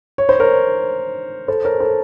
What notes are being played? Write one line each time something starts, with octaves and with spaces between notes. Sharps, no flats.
C#5
C5
A#4 C#5
A4 C5
A#4 C#5
A4 C5